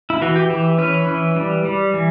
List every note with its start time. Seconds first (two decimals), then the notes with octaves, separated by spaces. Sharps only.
0.10 E4
0.22 E3 F#4
0.36 G4
0.50 E3
0.78 C#4 B4
1.08 E3
1.36 G3
1.65 G3
1.94 E3